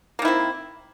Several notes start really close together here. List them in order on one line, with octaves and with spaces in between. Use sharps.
A#3 D#3 E4 C4